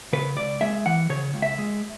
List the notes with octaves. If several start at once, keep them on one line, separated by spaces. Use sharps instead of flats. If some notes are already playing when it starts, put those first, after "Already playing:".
C#3 B4
C#2 D5
G#3 E5
E3 F#5
C#3 C#5
C#2
E5
G#3